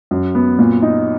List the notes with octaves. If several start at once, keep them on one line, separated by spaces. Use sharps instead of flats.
F#2
B3
A#2
D#4